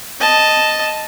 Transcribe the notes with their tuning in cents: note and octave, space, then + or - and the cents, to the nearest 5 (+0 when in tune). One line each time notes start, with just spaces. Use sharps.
D#5 +0 A5 +0